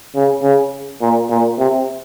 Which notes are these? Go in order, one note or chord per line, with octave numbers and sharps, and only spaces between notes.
C#3
C#3
A#2
A#2
C3